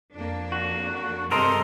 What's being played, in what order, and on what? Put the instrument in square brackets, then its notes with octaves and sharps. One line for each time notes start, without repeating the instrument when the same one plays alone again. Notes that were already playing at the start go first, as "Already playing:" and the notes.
[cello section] F2 A#3 D4
[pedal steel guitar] F#4
[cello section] G2 C3 G#3 [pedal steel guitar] A4 A#4 D#5 [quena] C6